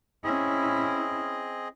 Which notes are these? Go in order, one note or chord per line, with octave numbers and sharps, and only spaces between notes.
C4 C#4 E4 G#4 D#5